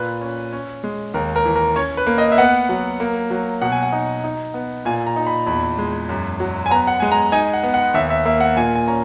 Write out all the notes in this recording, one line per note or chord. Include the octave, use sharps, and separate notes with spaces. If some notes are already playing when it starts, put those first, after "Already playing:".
Already playing: A#2 B4
C#4
C#4
G#3
D#2 A#4
A#4
E3
A#4
C#4 C#5
B4
A#3
D#5
E5
B3 F#5
F#3
A#3
F#3
B2 F#5
G#5
F#5
D#4
D#4
B3
A#2 G#5
A#5
D#4
B5
E2 B5
G#3
F#2
F#3
G#5
B3 A#5
F#5
G#3 G#5
A#5
D#4 G#5
F#5
B3
F#5
D#2 E5
E5
A#3 E5
F#5
A#2 G#5
G#5
C#4 A#5